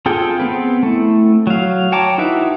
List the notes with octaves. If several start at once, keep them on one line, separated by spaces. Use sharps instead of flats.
C4 F4 G#4 A4 G5
B3 C4 B4
A3 E4
F#3 F5
C#5 G5 A5 A#5 D6
D#4 E4 F#4 B4 E5